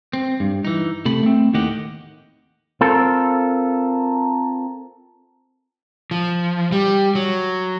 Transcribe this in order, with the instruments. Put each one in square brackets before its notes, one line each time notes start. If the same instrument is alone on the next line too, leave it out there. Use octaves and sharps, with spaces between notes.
[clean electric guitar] C4
G2
E3 D#4
C3 A3 B5
A3 C4
D#2 A2 D#3 G4 D#5 F#5
C4 F4 A4 A#4
[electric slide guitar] F3
G3
F#3